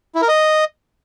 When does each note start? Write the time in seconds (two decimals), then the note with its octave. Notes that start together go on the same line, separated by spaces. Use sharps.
0.15 E4
0.22 A#4
0.28 D#5